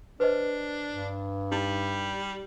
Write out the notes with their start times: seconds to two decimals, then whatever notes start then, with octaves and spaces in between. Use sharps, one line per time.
0.20 D4 B4 C5 D#5
0.91 G2
1.52 G3 D#4